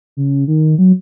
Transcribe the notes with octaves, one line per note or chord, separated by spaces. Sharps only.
C#3
D#3
F#3